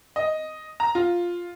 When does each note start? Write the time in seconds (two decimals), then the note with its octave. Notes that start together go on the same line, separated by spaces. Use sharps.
0.16 D#5
0.80 A#5
0.95 F4